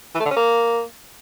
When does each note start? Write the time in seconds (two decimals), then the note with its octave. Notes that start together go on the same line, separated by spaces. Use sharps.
0.15 E3
0.20 A3
0.25 D3
0.31 C#4
0.36 A#3